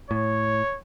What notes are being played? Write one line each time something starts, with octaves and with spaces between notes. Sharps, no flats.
A2 C#5